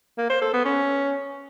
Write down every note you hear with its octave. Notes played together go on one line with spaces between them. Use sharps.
A#3
C5
A4
B3
C#4